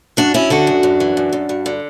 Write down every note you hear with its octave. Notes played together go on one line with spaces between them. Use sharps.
F#2 D4 F#4
F#2 C#4 E4
D3 D4 F#4
F#2
F#2
E3
F#2
F#2
G2
D3